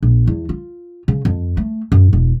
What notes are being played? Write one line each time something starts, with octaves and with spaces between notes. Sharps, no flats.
A#1
E2
F4
C#3
F2
A3
F#2
E1